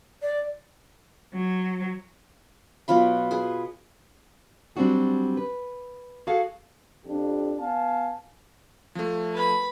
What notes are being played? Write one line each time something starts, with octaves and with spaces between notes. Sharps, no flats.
D5
F#3
B2 F#3 F4 B5
G#4 B4
F#3 G3 C4 D4 F#4 G#4
B4
F#4 G#4 A4 F5 F#5
F2 D4 G4
B3 F5 G#5 A5
F3 A3
B4 B5